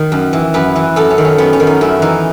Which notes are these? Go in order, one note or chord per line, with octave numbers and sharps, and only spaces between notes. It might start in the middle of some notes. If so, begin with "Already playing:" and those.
Already playing: D#3 D#5
F#2
E3
F#2 B4
E3
F#2 A4
C#4
D#3
C#4
F#2 B3
C#4
D#3
D#4
F#2 E4
E3 D#4